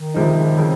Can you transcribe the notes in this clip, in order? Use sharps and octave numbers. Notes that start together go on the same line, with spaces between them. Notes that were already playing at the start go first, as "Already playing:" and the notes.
Already playing: D#3
C#2 C3 F3 G#3 D#4
C#3 F3 C4